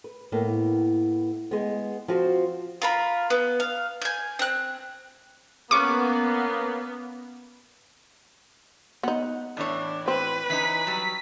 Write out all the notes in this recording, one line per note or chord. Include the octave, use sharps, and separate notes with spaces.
B4
A2 A#3 B3
G#3 B3
F3 C4 F#4 C5
F4 A#4 B5
B3
F5
G#5 G6
C4 F#6
A#3 B3 C#4 C#6 D6
B3 D#4 F#5
A2 E3 D4 C#5
C4 B4
E3 C#4 D#4 B6
F#3 G3